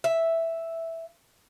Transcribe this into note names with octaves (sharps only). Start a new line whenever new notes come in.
E5